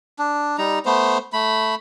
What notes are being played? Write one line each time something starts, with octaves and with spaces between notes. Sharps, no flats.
D4
G3 D#4 A#5
A3 B3 C5
A3 B5